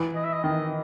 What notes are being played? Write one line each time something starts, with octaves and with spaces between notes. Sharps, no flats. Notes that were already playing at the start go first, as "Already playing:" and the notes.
Already playing: E3
D#5
E5
D#5
D#3 D#5